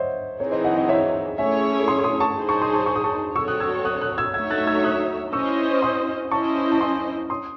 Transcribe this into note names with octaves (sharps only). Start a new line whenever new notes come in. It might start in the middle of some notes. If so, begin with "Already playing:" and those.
Already playing: C5 C#5 D#5 E5 F#5
E3 C4 D#4 G#4 C#5
C5 D#5
D#5 F#5
D#5 F#5
C#5 E5
A3 C#4 E4 G#4 C#5 E5 G#5
C6 D#6
C6 D#6
A5 C#6
D#4 G#4 C5
A5 C#6
C6 D#6
A5 C#6
C#6
D#6
A5 C#6
C4 F#4 A4 C#5 C#6 E6
D#6 F#6
E6 G#6
D#6 F#6
D#6 F#6
E6 G#6
A3 D#4 F#4 C#5 E5 E6 G#6
F#6 A6
E6 G#6
D#6 F#6
C#4 E4 C5 D#5 C#6 E6
C6 D#6
C#4 E4 C5 D#5 A5 C#6
A5
G#5 C6
C6 D#6